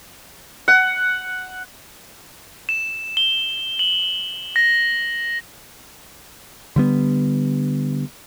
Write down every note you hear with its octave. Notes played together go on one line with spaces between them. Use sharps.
F#5
E7
G7
F#7
A#6
D3 G3 B3